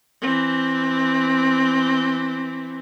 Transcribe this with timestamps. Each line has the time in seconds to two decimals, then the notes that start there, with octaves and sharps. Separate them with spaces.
0.22 E3 C4